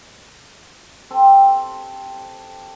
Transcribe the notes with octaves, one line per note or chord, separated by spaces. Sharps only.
C4 G4 A4